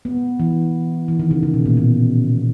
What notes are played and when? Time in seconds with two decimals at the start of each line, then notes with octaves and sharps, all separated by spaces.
0.05 B3
0.40 E3
1.08 E3
1.19 D#3
1.31 C#3
1.43 C#3
1.54 B2
1.66 A#2
1.77 B2